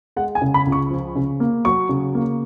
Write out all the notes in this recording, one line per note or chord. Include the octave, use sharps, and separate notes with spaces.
G#3 F#5
G#5
C#3
B5
C#2
C#6
F3
C#3
A#3
F#3 C#6
C#3
A#3